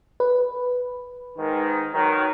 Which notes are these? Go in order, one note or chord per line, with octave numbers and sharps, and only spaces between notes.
B4
G#2 D#3
D#3 F#3 A#4